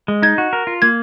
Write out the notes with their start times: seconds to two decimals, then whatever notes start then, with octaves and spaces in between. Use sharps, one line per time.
0.08 G#3
0.22 D#4 G#6
0.38 F#4
0.53 A#4
0.67 F4
0.82 A#3 G#6